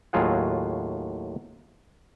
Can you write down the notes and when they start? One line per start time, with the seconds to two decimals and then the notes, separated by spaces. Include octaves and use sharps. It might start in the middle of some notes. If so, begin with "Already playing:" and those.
0.13 D#2 A2 F#3 F4 G#4 F#5